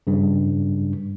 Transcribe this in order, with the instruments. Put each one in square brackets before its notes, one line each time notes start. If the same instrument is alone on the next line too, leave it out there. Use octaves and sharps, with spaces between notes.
[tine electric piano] G2 C#3